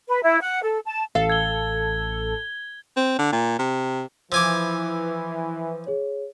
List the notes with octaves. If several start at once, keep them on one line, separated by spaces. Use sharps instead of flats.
B4
E4
F#5
A4
A5
A1 A4 F5
G#6 G7
C4
D3
A#2
C3
E3 F3 G#5 D6 E6 G#6
G#4 C#5